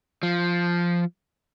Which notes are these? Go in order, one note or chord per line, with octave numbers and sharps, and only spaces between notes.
F3